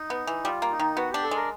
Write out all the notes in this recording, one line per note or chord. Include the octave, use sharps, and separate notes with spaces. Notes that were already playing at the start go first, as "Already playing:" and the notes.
Already playing: D#4
B3
E3
G3 F4
A#3
D#4
D#3
B3 F#4
D4 G4
A4
G#3 A#4